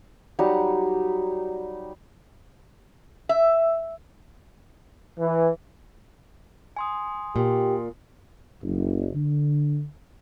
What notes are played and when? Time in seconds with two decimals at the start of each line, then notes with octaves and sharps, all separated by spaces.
0.39 F#3 G3 D#4 F#5
3.29 E5
5.19 E3
6.77 G#5 C6 D#6
7.36 A#2 G4
8.62 F#1
9.14 D3